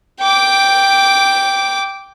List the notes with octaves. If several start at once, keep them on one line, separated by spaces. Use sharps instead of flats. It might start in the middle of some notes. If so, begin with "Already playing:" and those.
G5 D6